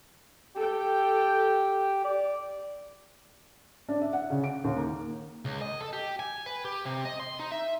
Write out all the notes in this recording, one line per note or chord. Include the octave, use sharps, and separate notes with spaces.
G4 A4 G5
D5
D4
E5
F#5
C#3
D7
D#2
A#3
C#2
D#5
A4
G4
G#5
B4
G4
C3
D#5
C6
D#4
E5